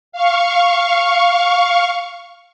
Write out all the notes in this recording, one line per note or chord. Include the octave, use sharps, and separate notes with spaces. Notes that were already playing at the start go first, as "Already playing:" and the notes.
F5 C#6